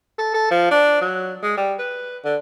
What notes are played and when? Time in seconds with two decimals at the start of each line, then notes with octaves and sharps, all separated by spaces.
0.18 A4
0.34 A4
0.51 F3
0.71 D4
1.01 F#3
1.43 G#3
1.57 G3
1.79 B4
2.25 D3